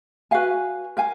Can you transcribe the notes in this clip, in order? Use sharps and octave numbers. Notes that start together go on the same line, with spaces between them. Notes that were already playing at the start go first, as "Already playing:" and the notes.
F#4 B4 F5 G#5
A#4 F5 G#5